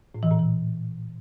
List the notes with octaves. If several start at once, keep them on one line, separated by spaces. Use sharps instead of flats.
A2
E3
A#2
E3